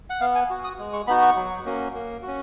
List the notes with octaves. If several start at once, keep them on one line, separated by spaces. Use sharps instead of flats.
F#5
B3 F5
G#5
F#4
D#6
G#3
C#6
B3 D#4 F#4 B5
C#6
F#3
A#3 C#4 F#4
A#3
C#4 F#4